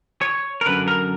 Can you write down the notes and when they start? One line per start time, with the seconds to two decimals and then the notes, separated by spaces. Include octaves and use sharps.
0.21 C#5
0.61 A#4
0.66 F#2 D3 B4
0.88 A#4